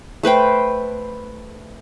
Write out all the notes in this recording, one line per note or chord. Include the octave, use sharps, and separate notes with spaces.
A3 B4 C5 G5